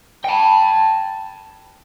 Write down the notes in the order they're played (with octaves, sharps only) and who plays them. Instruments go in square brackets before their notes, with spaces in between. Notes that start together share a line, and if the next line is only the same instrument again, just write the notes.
[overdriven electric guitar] G5 A5